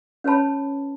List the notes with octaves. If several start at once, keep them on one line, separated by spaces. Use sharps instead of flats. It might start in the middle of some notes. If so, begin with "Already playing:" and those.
C#4 B4 C#5 A5 B5